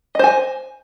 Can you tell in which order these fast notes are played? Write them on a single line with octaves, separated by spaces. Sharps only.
D#5 C5 G#5